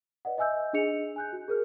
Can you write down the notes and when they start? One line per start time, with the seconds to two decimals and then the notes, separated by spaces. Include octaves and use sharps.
0.25 B4 D5 D#5 F#5
0.38 D#5 E5 G#5 E6 G6
0.73 D4 G#4 D#5 C#7 F7
1.16 G#5 F#6 G6
1.33 F#4
1.48 G#4 A#4 F6